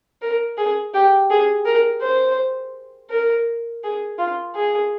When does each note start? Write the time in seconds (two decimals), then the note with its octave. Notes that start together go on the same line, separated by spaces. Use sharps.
0.22 A#4
0.58 G#4
0.94 G4
1.30 G#4
1.66 A#4
2.02 C5
3.10 A#4
3.84 G#4
4.18 F4
4.55 G#4